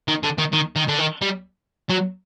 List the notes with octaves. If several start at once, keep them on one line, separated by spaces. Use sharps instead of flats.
D#3
D3
D#3
D#3
D#3
D3
D#3
G3
F#3